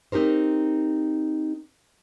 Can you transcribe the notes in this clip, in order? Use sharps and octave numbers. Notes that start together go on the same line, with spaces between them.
C4 D#4 G4 A#4 C5